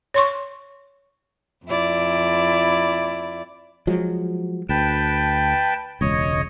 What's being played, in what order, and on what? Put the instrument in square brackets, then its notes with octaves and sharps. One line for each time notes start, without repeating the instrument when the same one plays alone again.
[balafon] C#5 C6 C#6
[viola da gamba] F2 E4 D5
[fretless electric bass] F3 F#3 G#3
[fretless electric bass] D2 [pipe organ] B4 G5 A5
[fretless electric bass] E1 C#2 [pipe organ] C#5 D#5